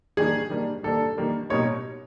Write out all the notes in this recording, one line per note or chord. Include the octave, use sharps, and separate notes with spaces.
D#3 G3 A#3 D4 G#4
D#3 G3 A#3 D4
D#3 G3 A#3 D4 A4
D#3 G3 A#3 D4
B2 G3 A#3 D#4 C#5